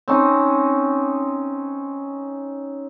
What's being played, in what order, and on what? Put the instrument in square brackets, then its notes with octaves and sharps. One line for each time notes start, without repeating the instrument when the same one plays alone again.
[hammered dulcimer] C4 C#4 D#4